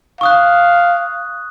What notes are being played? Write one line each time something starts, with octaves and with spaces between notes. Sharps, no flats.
F5 C#6 D#6 F#6